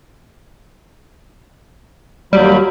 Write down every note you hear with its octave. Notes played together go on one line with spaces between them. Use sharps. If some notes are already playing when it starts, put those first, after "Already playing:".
D#2 F#3 G3 B5